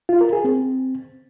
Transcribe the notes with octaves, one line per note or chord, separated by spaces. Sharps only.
F4
A#4
G#4
C4